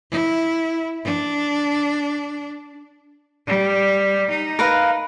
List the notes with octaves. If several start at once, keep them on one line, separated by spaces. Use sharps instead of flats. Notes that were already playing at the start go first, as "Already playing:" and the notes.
E4
D4
G3
D#4
A#4 B4 F5